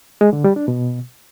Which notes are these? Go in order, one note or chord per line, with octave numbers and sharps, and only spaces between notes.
G#3
D3
G3
D4
B2